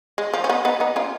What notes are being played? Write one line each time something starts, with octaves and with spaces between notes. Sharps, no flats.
G#3
F3
C#4
B3 D#4
B3 D#4
B3 D#4
C#4 F4